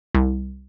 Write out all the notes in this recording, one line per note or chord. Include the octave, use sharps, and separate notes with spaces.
C2